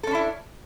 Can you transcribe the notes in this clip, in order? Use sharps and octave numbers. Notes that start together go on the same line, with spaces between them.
C#4 D4 E4 A4